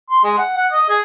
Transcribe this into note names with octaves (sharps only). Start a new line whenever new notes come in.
C6
G#3
F#5
F#5
D#5
G#4